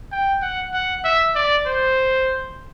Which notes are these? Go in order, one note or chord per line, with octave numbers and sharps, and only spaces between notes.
G5
F#5
F#5
E5
D5
C5